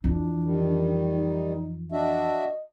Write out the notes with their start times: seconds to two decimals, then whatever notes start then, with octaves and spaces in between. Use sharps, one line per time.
0.04 F2 E3 D4
0.44 D#3 G3
1.14 D#4
1.92 D4 F#4 D#5 E5